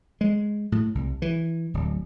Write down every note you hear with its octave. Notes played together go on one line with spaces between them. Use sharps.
G#3
A2
C2
E3
D1